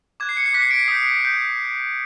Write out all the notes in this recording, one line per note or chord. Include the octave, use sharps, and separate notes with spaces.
D6 F#6 G#6
C7
C#7
C7
D6 F#6 B6
C7
D7
C7
D#6 G6 B6
D#6 G6